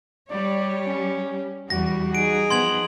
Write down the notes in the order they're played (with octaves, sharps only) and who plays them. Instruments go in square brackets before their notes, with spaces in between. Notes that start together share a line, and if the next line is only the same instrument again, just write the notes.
[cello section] G3 G4 [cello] C#5 [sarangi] D5
[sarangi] C#4
[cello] E2 [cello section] G3 [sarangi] F#4 [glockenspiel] A#6
[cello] D#4 G#4 [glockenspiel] D7
[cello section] F3 [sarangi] B3 [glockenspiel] C6 G#6 F#7